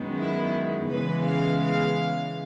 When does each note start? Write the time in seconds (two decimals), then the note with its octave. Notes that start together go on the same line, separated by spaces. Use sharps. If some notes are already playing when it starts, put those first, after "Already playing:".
Already playing: F#2 D#3 G#3 B3
0.18 E4
0.89 C#3 E3 G#3 B3 B4
1.25 F5
1.61 F5